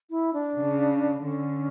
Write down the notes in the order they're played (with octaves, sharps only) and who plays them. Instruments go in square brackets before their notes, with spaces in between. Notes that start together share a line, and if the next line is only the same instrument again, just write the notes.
[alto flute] E4
D4
[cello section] C#3
[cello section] D3 [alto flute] C#4